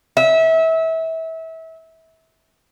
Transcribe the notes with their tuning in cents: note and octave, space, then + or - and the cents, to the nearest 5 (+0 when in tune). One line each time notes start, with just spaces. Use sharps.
E5 -25